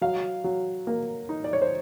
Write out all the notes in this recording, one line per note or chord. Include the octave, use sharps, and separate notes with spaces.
F#3 F5
F#3
A#3
D#4
D5
C#5
C5